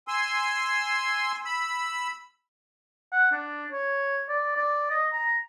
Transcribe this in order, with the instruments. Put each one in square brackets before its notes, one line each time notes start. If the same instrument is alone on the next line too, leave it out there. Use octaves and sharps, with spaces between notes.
[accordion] G#5 C6 E6
B5 E6
[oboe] F#5
D4
C#5
D5
D5
D#5
A#5